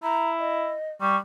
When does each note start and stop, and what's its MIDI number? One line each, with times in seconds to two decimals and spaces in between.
0.04 0.74 64
0.04 0.30 82
0.40 0.91 75
1.01 1.17 55
1.01 1.17 85